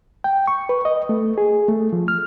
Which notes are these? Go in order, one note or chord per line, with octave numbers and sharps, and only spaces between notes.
G5
C#6
B4
D#5
A3
G#4
A3
F3
F6